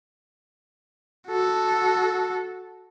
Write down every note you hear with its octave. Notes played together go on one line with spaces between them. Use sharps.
F#4 A4